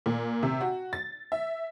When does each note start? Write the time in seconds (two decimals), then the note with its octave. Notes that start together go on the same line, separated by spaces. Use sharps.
0.06 A#2
0.43 C3
0.61 F#4
0.93 A6
1.32 E5